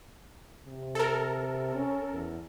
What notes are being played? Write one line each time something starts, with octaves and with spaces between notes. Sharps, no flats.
C3
A4 A#4
C#4
E2